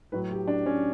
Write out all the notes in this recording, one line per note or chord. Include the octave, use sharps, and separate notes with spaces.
A2 F#3 B4
G4
D4
C#4